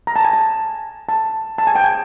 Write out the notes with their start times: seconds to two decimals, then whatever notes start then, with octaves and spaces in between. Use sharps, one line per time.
0.07 A#5
0.16 A5
0.25 G#5
0.33 A5
1.09 A5
1.58 A5
1.67 G#5
1.75 G5
1.84 G#5